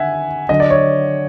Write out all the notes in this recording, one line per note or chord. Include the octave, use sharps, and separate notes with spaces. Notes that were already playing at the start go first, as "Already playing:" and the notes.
Already playing: D3 E5 F#5 G#5
D3 F#3 D#5
D5
C#5